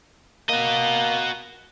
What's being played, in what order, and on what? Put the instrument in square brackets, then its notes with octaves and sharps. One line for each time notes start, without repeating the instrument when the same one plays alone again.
[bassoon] A#3 [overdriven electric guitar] F#4 D#5